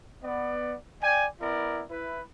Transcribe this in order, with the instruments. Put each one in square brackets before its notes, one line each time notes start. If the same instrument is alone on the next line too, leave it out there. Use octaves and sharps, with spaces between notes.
[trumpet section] B3 D5
D5 G5 G#5
B3 E4 A#4 D5
E4 B4